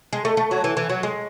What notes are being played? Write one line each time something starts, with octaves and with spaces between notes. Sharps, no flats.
G#3
A3
A3
F#3
E3
E3
F#3
G#3